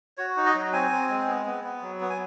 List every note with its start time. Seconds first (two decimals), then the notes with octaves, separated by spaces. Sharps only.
0.18 F#4 C#5
0.37 D#4
0.46 D#5
0.54 F#3
0.73 C4 G#5
0.91 C4
1.09 G#3
1.27 B3
1.46 B3
1.64 B3
1.82 F#3
2.01 B3
2.10 G#5